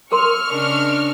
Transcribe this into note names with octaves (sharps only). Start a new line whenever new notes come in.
G#4 A#4 C6 C#6 F6
C#3 D4 D#5